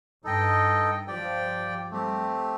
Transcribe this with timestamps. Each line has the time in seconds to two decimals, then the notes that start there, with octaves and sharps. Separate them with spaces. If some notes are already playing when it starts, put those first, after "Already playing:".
0.24 G2 D#4 A4 D#5 G5
1.07 F3 G4 D5 G5
1.90 G3 A3 C4 G4